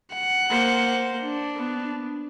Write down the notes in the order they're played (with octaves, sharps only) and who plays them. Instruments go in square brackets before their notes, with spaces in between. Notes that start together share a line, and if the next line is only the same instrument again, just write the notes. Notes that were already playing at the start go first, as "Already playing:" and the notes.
[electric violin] F#5
[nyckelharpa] A#3 C5
[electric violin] D4
[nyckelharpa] B3